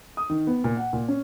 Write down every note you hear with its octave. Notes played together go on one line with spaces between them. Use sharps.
D#6
D#3
B3
A#2
F#5
A#2
C#4